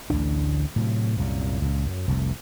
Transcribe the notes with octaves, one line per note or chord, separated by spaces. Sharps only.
A1 D2 D3 D4
A2 C3 F#3
C2 F#2 A#2
C#2 A#2
F#2
F1 C2 F2